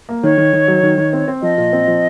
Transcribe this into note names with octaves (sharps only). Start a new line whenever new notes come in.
A#3
D#3 C#5
D#3
D#3
F#3
D#3
D#3
C4
C4
F3 D#5
A#2
C4
F3